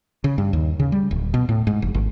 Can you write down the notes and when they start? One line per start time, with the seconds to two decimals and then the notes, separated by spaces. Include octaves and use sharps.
0.24 C#3
0.38 G2
0.53 D#2
0.80 C#3
0.92 G3
1.11 D1
1.34 B2
1.49 A2
1.67 G#2
1.82 F1
1.94 G#1